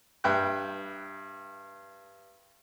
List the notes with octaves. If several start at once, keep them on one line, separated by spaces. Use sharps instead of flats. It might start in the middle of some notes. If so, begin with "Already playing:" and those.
G2 E5 G5 F#6